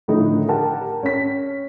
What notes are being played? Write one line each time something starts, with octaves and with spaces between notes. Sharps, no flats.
A2 D3 D#3 F3 D#4
G4 A#4 F#5 G5 A5
C#4 B6